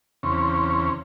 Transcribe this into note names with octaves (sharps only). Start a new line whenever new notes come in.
E2 C#3 C4 C#4